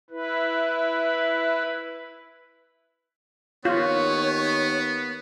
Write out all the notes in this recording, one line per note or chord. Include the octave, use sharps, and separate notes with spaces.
E4 B4
D#2 B3 F4 C#5